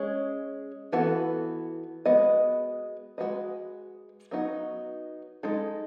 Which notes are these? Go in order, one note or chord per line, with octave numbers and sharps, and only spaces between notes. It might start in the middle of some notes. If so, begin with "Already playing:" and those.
Already playing: G#3 C#4 G#4 C#5
E3 B3 F#4 A4
G#3 B3 F#4 B4 D#5
G#3 B3 F#4 B4 D#5
F#3 B3 D#4 F#4
G#3 D#4 A4